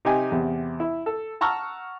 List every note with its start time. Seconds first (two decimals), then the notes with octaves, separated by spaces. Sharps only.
0.05 C3 D#4 G4 G#5
0.32 E2 C3
0.80 E4
1.06 A4
1.41 F#5 A5 A#5 C#6 E6 F6